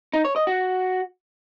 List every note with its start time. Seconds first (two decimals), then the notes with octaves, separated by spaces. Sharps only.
0.13 D#4
0.25 C#5
0.36 D#5
0.47 F#4